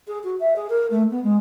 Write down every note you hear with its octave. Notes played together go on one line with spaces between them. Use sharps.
G#4
F#4
E5
G#4
A#4
A3
B3
G#3